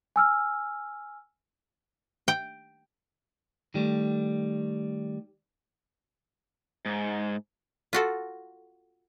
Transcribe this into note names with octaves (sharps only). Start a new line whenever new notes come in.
G#5 E6 F6
G5
D#3 G3 A3
G#2
F4 F#4 A4